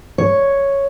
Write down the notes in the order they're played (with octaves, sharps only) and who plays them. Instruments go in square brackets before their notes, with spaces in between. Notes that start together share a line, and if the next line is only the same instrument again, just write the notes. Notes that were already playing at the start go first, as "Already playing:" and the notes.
[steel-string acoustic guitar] C#5